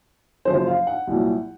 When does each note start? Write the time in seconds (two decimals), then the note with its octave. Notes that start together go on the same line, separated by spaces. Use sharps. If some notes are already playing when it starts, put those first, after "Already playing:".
0.45 F#1 F#2 F3 C5
0.66 F5
0.87 F#5
1.07 C2 A#2 F#3